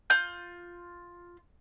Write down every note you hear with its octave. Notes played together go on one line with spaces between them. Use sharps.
F4 G6